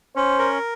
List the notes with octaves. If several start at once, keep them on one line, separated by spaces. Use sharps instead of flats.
C#4 C5
A#4